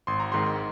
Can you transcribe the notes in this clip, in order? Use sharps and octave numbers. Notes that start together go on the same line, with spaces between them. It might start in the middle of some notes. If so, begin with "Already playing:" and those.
G#1 C6
A#5
G#2 D#3 C6